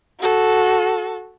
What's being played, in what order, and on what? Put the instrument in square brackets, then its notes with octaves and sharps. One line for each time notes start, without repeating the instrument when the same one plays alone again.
[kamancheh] F#4 A4